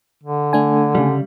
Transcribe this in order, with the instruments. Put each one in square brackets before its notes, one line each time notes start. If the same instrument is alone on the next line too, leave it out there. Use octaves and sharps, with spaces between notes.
[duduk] D3
[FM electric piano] A3 D4 G#5
[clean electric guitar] C#3 G3